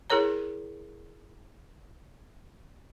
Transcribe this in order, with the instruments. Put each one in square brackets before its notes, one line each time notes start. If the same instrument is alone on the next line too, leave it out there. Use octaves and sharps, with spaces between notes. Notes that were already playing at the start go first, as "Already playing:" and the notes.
[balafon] E4 G#4 A#4 C#5 A#5